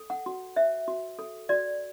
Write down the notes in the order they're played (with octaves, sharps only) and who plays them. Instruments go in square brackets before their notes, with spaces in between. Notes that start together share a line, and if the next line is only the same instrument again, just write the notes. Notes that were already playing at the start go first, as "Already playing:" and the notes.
Already playing: [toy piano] A4
F#5
F#4
C5 E5
F#4
A4
F#4 D5